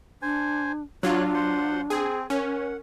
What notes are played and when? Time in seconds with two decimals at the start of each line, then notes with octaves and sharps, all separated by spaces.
0.22 D4 C5 G#5
1.03 F#3 D4 F4 C#5 D5 F#6
1.34 C5 F#5 C6
1.90 C4 G#4
2.30 C#4 A#4 F#5